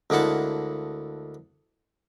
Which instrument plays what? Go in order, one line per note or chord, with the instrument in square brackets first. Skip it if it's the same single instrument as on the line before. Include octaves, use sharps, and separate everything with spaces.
[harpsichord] D2 G#3 A#3 E4 F#5 A5